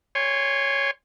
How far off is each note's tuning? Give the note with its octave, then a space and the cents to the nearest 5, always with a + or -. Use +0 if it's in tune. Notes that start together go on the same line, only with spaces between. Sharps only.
C#5 +0 G#5 -35 C6 +0